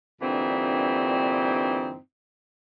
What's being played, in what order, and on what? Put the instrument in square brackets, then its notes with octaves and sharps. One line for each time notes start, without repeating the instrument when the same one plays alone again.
[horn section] G2 A#2 D3 E3 C4 D#4